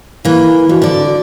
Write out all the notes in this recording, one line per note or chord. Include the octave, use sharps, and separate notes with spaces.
E3 A#3 E4
F2 F#4
D3 D5